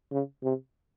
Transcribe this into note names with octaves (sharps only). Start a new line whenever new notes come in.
C#3
C3